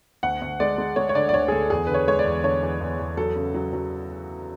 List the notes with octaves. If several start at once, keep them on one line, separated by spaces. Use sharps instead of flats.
D2 F#5
D2
G#3 D5
G#3
G#3 C#5
C#5
D3 D5
D5
D2 C#5
G#4
D2 A4
E2 G#4
D3 B4
C#5
G#3 C#5
D5
E2
D3 C#5
E2
E2
E2
F#3 A4
C#3
F#3
F#3